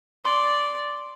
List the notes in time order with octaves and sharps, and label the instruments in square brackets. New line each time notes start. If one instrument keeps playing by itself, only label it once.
[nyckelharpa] D5 [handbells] C6